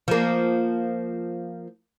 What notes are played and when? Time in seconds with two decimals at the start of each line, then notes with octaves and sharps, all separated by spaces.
0.08 F3 A#3